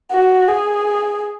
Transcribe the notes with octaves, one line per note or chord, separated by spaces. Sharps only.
F#4
G#4